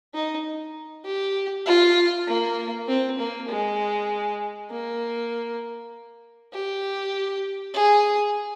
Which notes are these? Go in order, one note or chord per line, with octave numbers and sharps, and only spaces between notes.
D#4
G4
F4
A#3
C4
A#3
G#3
A#3
G4
G#4